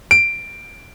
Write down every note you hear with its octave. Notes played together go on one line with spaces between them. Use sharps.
D7